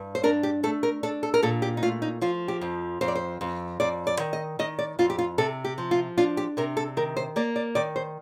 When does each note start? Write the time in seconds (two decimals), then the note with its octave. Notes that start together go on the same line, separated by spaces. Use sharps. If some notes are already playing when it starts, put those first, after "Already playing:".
Already playing: G2
0.15 C5
0.23 D4 A#4
0.43 G4
0.63 A3 A4
0.83 A#4
1.03 D4 A4
1.23 A4
1.34 A#4
1.43 A#2 A4
1.62 G4
1.77 D#4
1.83 A3 F4
2.02 D#4
2.21 F3 F4
2.48 G4
2.61 F2
3.01 F2 C5
3.08 D5
3.15 C5
3.41 F2
3.80 F2 D5
4.07 D5
4.19 D#3
4.33 D#5
4.59 D#3 D#5
4.79 D5
4.99 F2 F4
5.10 G4
5.19 F4
5.38 C3 A4
5.64 G4
5.78 F3
5.91 F4
6.18 D4 F4
6.37 G4
6.57 C3 A#4
6.77 A4
6.97 D#3 A#4
7.17 C5
7.36 A#3 D5
7.56 D5
7.75 D#3 D5
7.96 C5